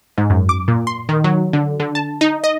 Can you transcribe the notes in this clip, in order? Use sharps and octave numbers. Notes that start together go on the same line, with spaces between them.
G#2
F#2
D6
A#2
C6
D#3
F#3
D3
D3
A5
D#4
D#5